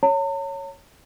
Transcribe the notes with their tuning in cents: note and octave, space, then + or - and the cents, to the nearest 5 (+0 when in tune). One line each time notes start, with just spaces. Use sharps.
C#5 +0 A#5 -45